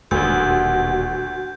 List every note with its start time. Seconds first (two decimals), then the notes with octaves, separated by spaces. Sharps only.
0.11 D#1 D2 B2 F#4 G6